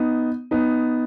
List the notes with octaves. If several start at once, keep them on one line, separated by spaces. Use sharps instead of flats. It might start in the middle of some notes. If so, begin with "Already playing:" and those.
Already playing: B3 D#4
B3 D#4